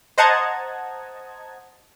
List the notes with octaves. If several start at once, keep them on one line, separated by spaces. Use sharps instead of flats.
C5 D#5 F#5 A5 A#5 G#6